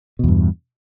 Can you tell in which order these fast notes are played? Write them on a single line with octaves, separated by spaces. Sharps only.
B2 E2 G2